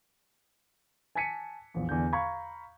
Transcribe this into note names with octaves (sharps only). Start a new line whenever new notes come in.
G#5 A5 G#6 B6 C#7 D#7
A#1 E2
E2 D3 G6
F5 A#5 B5 C#6 G#6